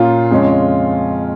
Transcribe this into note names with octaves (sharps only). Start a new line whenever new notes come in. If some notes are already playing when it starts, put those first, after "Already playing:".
Already playing: A#2 A#3 C#4 F4
F2 C#3 G#3 C#4